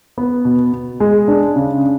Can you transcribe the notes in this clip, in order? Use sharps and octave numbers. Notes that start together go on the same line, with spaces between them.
B3
B2
B2
G#3
D4
C#3